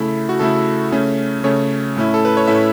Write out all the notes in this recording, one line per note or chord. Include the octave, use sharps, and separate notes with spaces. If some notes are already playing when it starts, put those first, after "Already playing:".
Already playing: C#3 A3 E4
F#4
C#3 A3 E4 A4
C#3 A3 C#4
C#3 A3 C#4 C#5
A2 A3 C#4 E4
A4
B4
C#5
A2 A3 C#4 E4 E5